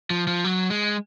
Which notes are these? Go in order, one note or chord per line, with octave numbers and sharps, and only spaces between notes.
F3
F3
F#3
G#3